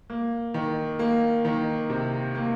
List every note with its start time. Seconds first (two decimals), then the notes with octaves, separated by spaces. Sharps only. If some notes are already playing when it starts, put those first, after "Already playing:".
0.10 A#3
0.54 D#3
0.99 A#3
1.45 D#3
1.90 C3
2.35 A#3